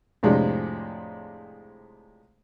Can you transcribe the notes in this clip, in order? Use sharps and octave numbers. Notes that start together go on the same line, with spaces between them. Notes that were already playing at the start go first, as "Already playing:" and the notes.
F2 A2 C3 G#3 D4